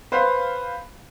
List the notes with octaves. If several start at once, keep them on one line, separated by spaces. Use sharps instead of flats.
B4 C5 F5